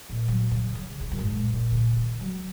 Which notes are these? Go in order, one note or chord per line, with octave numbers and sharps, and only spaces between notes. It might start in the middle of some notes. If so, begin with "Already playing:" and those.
A#2
F#3
C#3
C#3
C#3
F#2
G#2
A#2
A#2
C#3
D#3
F#3